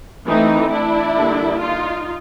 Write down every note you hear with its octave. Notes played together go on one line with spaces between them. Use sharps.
E3 A3 C4 D#4
D4 E4
D3 G3 A#3
D#4 F4